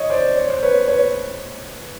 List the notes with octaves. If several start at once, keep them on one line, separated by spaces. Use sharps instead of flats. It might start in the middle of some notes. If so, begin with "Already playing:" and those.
Already playing: C#5 D#5
C5 D5
C#5
C5
B4 C#5
B4 C#5